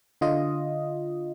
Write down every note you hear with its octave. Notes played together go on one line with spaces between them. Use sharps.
D3 F4 D#5